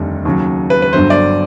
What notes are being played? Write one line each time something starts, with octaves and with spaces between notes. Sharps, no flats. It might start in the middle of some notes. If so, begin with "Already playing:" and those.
Already playing: F1 D#2 D3 G3
D#2 C#3 F#3
B4
B4
G1 G2 D3 F#3 C5
D5